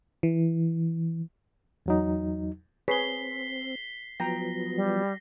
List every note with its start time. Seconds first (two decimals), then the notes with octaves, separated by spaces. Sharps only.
0.23 E3
1.86 E2 F#3 D#4
2.88 C4 G#4 B4 C#5 B6 C7 G7
4.20 F3 F#3 B3 G5 A#5 A#6
4.76 G3